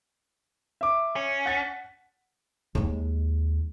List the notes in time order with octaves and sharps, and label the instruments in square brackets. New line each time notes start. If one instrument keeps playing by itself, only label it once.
[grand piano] E5 D6
[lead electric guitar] C#4
[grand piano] F#5 A6 B6
[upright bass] D#2 G#3